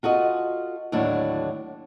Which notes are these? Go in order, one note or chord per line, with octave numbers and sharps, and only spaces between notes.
F4 F#4 A4 D#5
D#2 A2 D3 F#3 D4